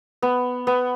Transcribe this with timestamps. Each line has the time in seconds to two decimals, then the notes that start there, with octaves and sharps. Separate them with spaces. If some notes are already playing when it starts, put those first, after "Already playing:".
0.22 B3
0.67 B3